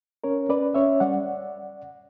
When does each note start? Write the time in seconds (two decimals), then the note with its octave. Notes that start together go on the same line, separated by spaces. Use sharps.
0.24 C#4 A#4 C#5
0.49 C#4 B4 D5
0.75 C#4 C#5 E5
1.00 G3 D5 F#5